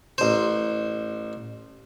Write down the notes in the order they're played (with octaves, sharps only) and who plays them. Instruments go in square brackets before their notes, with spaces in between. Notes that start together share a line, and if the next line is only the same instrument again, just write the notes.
[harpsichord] A1 C5